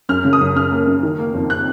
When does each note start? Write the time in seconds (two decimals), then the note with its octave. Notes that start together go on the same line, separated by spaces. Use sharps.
0.09 F#2 F6
0.25 C#3
0.33 D#6
0.41 F#2
0.56 F#2 F6
0.71 A#3
0.87 F#2
1.03 D#3
1.19 A#3
1.34 F2
1.50 F#6